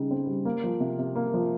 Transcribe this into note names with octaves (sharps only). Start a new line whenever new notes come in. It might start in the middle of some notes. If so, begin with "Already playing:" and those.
Already playing: C#3 G3 D#4
C4
G3
A#3
F3
C3
C3
A#3
F3